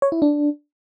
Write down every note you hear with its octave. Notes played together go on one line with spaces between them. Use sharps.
C#5
E4
D4